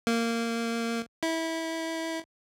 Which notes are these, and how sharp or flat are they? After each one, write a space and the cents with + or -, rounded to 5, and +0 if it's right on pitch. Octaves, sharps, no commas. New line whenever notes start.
A#3 -15
E4 -20